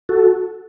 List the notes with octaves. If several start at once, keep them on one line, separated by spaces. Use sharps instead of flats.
F#4 A4